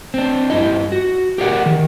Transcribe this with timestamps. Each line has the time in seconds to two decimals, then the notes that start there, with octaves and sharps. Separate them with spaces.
0.14 C4 D4
0.50 G2 E4 D#5
0.92 F#4
1.38 G4 G#4 A#4 D5 F5 F#5
1.66 D#3